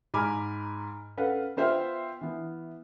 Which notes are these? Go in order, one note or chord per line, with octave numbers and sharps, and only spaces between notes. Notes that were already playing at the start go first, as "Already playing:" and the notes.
G#2 G#5 A#5 B5 D6 F6
C#4 A4 B4 F5 F#5
B3 F4 C5 E5 G5 F6
E3 B3